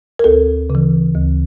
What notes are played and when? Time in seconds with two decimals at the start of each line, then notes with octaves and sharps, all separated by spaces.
0.19 A#4
0.24 D2 A4
0.70 C#3
0.75 E3
1.15 D2